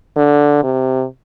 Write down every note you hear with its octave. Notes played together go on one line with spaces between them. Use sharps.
D3
C3